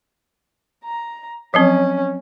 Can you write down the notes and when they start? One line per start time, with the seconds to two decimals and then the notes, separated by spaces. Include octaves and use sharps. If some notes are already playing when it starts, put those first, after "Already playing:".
0.84 A#5
1.54 F3 F#3 C4 C#4